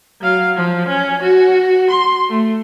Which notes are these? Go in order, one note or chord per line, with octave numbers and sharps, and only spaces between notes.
F#3 F5
F3
C#4
F#4
C6
A3